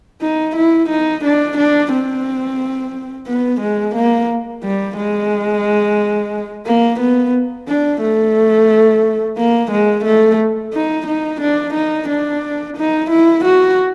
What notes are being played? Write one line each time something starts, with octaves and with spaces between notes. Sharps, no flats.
D#4
E4
D#4
D4
D4
C4
B3
G#3
A#3
G3
G#3
A#3
B3
D4
A3
A#3
G#3
A3
D#4
D#4
D4
D#4
D4
D#4
E4
F#4